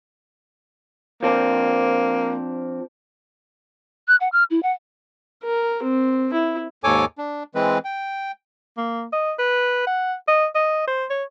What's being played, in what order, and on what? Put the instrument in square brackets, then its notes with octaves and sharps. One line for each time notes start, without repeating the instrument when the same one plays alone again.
[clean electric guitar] F3 C4 D4 [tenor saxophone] A#3
[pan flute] F#6
F#5
F6
E4
F#5
[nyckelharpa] A#4
C4
E4
[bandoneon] D#2 G#2 A4 C#5 G#5 D6
D4
E3 G#3 C4 B4
G5
[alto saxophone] A#3
D#5
B4
F#5
D#5
D#5
C5
C#5